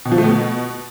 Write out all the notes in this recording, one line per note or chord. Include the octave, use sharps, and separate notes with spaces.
B2
F3
A3
B2